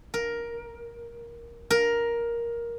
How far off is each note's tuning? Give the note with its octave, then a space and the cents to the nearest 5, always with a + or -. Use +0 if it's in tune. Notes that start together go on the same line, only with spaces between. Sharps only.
A#4 +10
A#4 +10